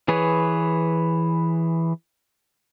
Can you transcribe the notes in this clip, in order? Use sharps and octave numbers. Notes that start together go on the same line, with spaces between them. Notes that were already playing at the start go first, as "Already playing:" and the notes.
E3 G#4 B4 C#5